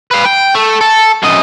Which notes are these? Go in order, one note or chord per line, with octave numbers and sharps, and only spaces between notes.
B4 F5
G5
A3
A4
F#2 D#5